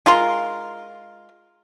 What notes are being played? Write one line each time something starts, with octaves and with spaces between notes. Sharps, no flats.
G#3 F4 A#4 C6